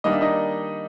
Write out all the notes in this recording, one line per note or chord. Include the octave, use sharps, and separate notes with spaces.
D#3 G3 A#3 D4 D#5
E5
D#4 D#5